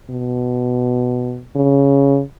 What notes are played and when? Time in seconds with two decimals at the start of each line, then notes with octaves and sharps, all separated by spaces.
0.10 B2
1.56 C#3